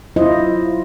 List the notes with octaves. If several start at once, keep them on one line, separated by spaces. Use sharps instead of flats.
F#3 E4 F4 C5 D#5